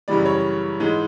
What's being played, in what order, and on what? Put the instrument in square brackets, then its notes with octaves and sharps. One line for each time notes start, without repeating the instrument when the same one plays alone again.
[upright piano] F#2 C#3 E3 G3 D5
C#5
G#2 E3 G#3